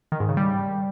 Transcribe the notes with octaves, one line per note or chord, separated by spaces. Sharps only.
D#3
G#2
C#3
G3